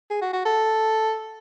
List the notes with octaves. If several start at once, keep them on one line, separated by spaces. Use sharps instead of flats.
G#4
F#4
F#4
A4